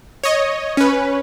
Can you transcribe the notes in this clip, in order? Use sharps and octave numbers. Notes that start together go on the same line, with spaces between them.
C#5 D#5
C#4 B4